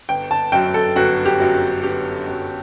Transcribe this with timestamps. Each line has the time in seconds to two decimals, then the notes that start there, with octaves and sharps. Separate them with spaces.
0.09 G1 G5
0.31 A5
0.52 F#2 F#3 G5
0.74 A4
0.96 G1 F#4
1.26 G4
1.40 F#2 F#3
1.84 G1 G4
2.28 F#2 F#3